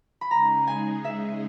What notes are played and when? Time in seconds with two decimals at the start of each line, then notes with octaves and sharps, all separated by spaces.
0.21 B5
0.31 C#3 G#3 D#4 G#4 A#5
0.67 G#5
1.04 E5